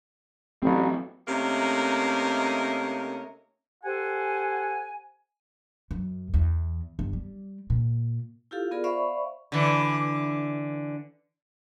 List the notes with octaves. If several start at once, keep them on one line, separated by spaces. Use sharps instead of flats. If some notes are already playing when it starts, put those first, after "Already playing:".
A1 F#3 C4
C3 A3 A#3 C#4 D#4 A#4
G4 A4 C5 F#5 G#5
F#2
E2
G1
G3
A#2
E4 F4 G4 A4 F5
B3 F4 G#4 A#4 D5
C5 D5 E5 F5 B5 C#6
D3 E3